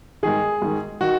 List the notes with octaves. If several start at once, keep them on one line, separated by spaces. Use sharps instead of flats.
G#2 D#3 G#4
G#2 D#3
D#3 F#4